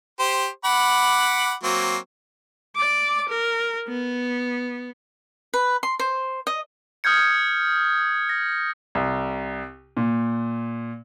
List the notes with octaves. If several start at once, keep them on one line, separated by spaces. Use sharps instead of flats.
G4 C5
F#5 B5 D6
F#3 A#3 C4
D5 D6
A#4
B3
B4
C6
C5
D#5
D#6 F6 G6 G#6 C#7
A#6
C2
A#2